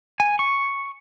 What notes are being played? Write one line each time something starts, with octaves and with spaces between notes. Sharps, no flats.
G#5
C#6